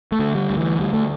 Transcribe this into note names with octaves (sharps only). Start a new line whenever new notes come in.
A3
D3
G3
D2
E3
D2 G3
A3